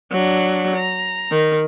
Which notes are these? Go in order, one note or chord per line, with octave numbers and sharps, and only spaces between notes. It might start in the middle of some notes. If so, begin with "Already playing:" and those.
F#3 D4
A#5
D#3